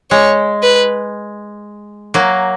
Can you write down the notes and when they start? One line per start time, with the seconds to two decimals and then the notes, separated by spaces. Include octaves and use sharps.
0.11 G#3 C#5
0.63 B4
2.14 F#3 A#3